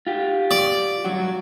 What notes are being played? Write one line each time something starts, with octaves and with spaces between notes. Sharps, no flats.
F4 G4
D5
G2 F#3 F#4